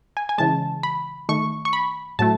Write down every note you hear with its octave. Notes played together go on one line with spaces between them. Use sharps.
G#5
G#5
C#3 E3 G#3 A5
B5
D#3 A3 C#6
C#6
B5
A2 F#3 A3 A5